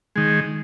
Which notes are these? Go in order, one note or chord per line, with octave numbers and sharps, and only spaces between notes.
D#3 G#3